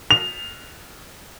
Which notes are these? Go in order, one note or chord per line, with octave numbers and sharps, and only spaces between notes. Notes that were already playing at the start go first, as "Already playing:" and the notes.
F7